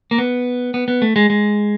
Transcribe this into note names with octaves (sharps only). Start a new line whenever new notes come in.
A#3
B3
B3
B3
A3
G#3
G#3